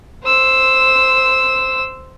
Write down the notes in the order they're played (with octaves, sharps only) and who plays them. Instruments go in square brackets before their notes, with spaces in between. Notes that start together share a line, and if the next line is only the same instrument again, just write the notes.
[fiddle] C5 E6